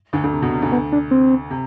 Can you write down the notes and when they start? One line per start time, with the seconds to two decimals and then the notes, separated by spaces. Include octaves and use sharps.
0.13 D2 D3
0.24 D2 D3
0.33 C3
0.42 B2
0.52 C3
0.62 D2 D3
0.72 B3
0.92 D4
1.11 C4
1.50 C3